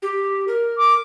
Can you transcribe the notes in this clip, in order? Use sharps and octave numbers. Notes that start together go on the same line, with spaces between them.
G4
A#4
D6